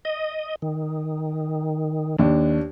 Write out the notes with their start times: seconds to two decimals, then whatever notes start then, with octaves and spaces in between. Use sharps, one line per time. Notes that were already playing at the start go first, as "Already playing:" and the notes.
0.05 D#5
0.62 D#3
2.18 D#2 D4